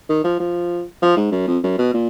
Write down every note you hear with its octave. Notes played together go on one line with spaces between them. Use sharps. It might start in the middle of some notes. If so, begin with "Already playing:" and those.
D#3
F3
F3
F3
G#2
F#2
F2
F#2
B2
A#2